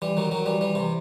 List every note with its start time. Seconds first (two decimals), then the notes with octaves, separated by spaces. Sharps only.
0.02 E3 G3
0.17 D#3 F#3
0.31 D#3 F#3
0.46 E3 G3
0.61 E3 G3
0.75 C3 E3